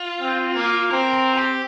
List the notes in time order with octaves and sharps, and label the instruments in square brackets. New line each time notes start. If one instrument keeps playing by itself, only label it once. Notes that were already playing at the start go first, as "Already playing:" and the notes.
Already playing: [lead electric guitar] F4
[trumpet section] C4
A#3
[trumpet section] C4 [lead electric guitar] A#4
[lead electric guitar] A#4
F4
G4